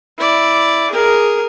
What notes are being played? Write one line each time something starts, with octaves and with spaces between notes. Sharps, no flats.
E4 D5
G#4 A#4